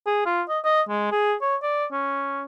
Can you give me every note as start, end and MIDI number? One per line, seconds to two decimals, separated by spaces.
0.06 0.22 68
0.26 0.42 65
0.49 0.59 75
0.64 0.81 75
0.89 1.11 56
1.12 1.34 68
1.42 1.56 73
1.62 1.85 74
1.92 2.43 61